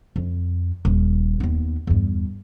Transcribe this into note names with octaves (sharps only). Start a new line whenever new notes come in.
F2
D#1
D#2 B3
E2 G2